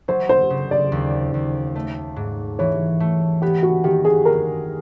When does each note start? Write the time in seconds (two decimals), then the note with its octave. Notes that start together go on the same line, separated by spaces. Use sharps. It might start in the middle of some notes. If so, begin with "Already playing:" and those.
0.08 F#3 C5
0.29 C5
0.50 C#3
0.71 D5
0.92 D#2
1.34 D#2
1.76 A3
2.16 G#2
2.59 E3 C#5
3.00 A3
3.42 B3 G4
3.63 F#4
3.84 D#3 G4
4.05 G#4
4.25 G#3 A#4